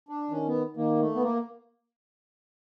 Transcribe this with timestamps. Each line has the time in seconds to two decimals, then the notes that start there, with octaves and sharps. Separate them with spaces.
0.09 D4
0.31 D#3 C#4
0.47 B3
0.77 D#3 A#3
0.99 A3
1.15 B3
1.22 A#3